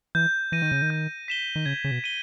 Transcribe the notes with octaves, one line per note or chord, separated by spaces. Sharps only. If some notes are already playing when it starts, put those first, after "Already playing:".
E3 G6
E3 A#6 D#7
D#3
C#3
D#3
G6
B6 E7 G7
D#3
C#3 G#6
C#3
B2
D#7 G7